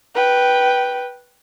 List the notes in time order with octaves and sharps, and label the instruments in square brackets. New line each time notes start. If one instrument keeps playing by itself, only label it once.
[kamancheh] B4 G5